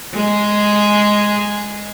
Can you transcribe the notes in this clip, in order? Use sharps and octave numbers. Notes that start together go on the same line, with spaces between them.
G#3 G#4